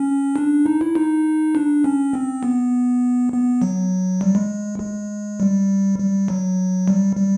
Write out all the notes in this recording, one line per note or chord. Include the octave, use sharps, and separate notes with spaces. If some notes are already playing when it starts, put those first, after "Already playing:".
Already playing: C#4
D4
D#4
E4
D#4
D4
C#4
C4
B3
B3
F#3
G3
G#3
G#3
G3
G3
F#3
G3
G3